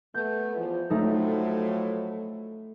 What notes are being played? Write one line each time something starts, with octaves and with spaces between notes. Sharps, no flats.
A3 B3 G6
E2 F3
A2 F3 F#3 A3 D#4 A4